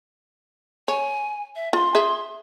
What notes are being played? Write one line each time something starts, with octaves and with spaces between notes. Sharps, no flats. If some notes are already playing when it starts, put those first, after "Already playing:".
C#5 G#5
E5
F4 C6
G#4 E5